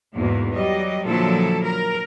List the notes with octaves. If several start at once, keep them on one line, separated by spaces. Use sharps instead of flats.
E2 G#2 B2 A#3
F#3 G3 D#5
A#2 D3 F3 F#3 E4 A4
A#4